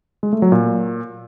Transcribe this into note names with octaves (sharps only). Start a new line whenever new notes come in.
G#3
A3
F#3
A#2